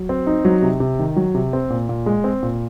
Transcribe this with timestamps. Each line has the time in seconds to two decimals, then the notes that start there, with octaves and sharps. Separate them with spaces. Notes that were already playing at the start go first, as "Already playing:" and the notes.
Already playing: F#3
0.09 C4
0.27 D#4
0.45 F#3
0.62 C3
0.80 C3
0.99 D#3
1.16 F#3
1.35 C3
1.53 C4
1.70 A#2
1.89 A#2
2.06 G#3
2.24 C4
2.43 A#2